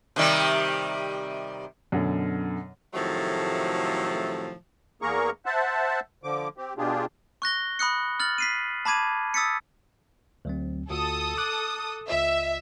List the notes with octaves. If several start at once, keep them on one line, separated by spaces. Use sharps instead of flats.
C3 D#3 G3
F#2 B2 D3
A2 C3 D#3 F3 F#3 A3
E2 A#3 G#4 A#4 A#5 C#6
C5 E5 F#5 A5
D3 F3 D6
C4 G4
B2 D4 F4 G4 G#4
C#6 F#6 A#6 G7
B5 D#6 F#6 C#7
F6 A6 F#7
B6 C7 D#7
A5 B5 D6 G#6 D#7
D#6 E6 A6 B6 C#7
D2 F#3 C4
D2 F4 F#4 A4 D#6
D6 F#6
C#2 F4 D#5 E5